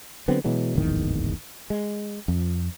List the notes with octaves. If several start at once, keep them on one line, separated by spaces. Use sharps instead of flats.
D3 F#3 B3 C4
B2 E3 F#3 G#3
D1 G#1 E2 D#3
G#3
F2